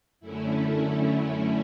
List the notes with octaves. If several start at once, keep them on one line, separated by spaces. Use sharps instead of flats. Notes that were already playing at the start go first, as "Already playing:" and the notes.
F#2 D3 A3 C#4 E4